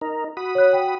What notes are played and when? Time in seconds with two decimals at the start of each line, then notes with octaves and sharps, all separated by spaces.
0.01 D#4 A#4
0.37 F#4 B5 D#6
0.55 C#5 F#6
0.73 G5